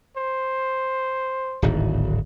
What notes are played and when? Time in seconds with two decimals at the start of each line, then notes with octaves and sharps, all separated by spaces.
0.17 C5
1.62 D1 G#1